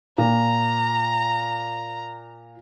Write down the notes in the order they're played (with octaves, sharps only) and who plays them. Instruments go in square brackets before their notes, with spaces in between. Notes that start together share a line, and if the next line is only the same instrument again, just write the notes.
[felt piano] A#2 [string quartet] A#5